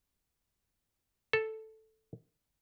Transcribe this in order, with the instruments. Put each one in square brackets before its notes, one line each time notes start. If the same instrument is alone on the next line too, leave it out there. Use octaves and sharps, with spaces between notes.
[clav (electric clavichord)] A4